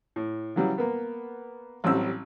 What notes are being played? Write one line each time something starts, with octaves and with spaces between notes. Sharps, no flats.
A2
C#3 E3 F#3 G3
A#3 B3
A1 F#3 G3 C4 C#4 E6